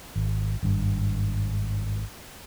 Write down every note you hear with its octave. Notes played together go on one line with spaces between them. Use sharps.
G#1
G#1 G2